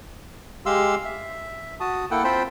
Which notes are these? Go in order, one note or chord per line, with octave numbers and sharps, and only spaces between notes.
G#3 G4 F5 C6 E6
E5
F#4 A5 D#6
A#3 E4 A4 F#5 G5
C4 F4 C5 G5 A5 B5